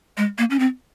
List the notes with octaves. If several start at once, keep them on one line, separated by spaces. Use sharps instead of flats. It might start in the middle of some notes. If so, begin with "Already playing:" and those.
G#3
A#3
C#4
C4